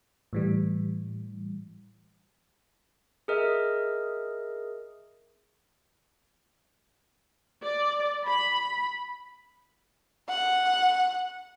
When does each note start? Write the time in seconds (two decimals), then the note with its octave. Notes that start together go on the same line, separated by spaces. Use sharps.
0.33 A2 E3 G3
3.28 G#4 A#4 D#5 E5
7.63 D5
8.27 B5
10.29 F#5